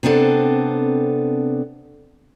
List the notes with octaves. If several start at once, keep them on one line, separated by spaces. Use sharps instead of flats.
C3 B3 C4 D4 A4